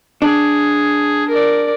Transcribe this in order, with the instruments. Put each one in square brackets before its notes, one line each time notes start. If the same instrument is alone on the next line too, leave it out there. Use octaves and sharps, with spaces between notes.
[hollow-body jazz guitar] D4 [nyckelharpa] G#4
[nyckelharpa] A#4 D5